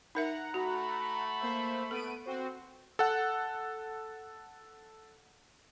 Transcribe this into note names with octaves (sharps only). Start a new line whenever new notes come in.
D#4 A#4 E5 F#5 A#5
A3 F#4 B5
A#3 C5 E5
B3 A4 D7 D#7
C4 F#4 C5
A4 F#5